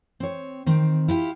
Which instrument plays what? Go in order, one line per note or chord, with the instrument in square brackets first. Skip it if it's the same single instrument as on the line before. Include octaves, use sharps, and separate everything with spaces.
[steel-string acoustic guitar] C4 C#5
D#3 C4
E4 F4 G4